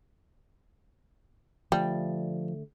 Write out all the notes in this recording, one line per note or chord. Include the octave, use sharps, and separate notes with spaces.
D3 F3 G3 A3